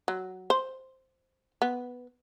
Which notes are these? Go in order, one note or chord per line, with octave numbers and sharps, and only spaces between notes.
F#3
C5
B3